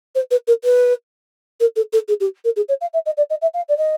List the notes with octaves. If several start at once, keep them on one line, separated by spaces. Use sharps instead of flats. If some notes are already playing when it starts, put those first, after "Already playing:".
C5
B4
A#4
B4
A#4
A4
A4
G#4
G4
A#4
G#4
C#5
F5
E5
D#5
D5
D#5
E5
F5
D5
D#5